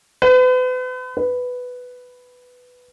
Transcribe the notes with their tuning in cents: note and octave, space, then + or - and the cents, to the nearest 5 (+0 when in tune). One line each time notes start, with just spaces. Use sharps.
B4 +40
B4 +5